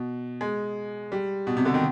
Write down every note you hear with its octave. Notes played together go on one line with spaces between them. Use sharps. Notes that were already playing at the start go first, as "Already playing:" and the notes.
Already playing: B2
G#3
G3
B2
C3
D3
D#3